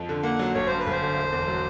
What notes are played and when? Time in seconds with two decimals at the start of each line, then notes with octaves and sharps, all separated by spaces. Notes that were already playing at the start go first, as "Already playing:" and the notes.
Already playing: F2 F3
0.09 D3
0.23 A#3 F#5
0.39 F#3
0.55 G1 C#5
0.67 G2 C5
0.79 B4
0.86 G1
0.92 C5
1.01 D3
1.17 E1
1.32 E2
1.48 F#3